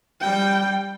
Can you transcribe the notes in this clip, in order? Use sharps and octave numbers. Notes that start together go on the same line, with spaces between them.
G3 G5